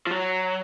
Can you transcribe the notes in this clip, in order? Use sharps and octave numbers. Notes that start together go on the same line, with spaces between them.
F3
F#3